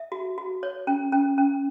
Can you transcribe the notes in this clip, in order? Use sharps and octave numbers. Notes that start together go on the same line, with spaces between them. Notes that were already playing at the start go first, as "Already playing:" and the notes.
Already playing: E5
F#4
F#4
C#5
C#4
C#4
C#4